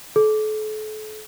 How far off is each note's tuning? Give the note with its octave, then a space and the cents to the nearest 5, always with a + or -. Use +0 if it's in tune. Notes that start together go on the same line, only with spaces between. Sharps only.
A4 -35